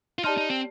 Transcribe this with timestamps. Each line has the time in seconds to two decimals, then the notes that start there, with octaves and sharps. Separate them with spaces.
0.19 F4
0.24 D#4 G4 D5 A5 C6 F6
0.37 D#4
0.49 C4